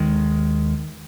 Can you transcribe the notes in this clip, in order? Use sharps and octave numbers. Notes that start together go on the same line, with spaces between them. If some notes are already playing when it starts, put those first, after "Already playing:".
Already playing: D#2 D#3 G#3